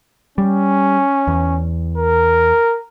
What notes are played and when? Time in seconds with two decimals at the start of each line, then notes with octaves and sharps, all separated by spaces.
0.38 G3 C#4
1.28 E2
1.98 A#4